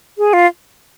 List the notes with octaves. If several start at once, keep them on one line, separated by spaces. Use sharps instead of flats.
G#4
F4